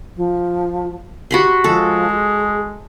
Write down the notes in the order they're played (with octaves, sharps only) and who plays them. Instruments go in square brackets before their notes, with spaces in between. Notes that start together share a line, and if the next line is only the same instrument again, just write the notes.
[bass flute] F3
[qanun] F#4 B5 C6 [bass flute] G4
[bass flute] F3 [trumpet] G#3 [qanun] A4
[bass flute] G#4